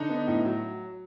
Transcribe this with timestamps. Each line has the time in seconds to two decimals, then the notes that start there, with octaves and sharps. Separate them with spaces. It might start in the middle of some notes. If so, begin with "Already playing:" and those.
Already playing: D3 D#4
0.09 B3
0.27 A2
0.45 F#3